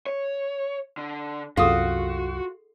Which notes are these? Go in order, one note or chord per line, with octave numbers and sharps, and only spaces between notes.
C#5
D3
C2 F#2 F4 F#4 G#4 A4 D6